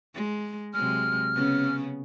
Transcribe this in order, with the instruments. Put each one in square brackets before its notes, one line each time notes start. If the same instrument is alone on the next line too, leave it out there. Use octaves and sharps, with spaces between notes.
[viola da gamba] G#3
[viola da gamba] C3 F#3 G#3 [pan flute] F6
[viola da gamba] C#3 B3 C#4